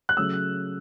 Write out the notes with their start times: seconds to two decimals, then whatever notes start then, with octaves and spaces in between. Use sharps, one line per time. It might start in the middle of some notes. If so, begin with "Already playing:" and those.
0.09 F#6
0.17 C#3 F#3 A3 E6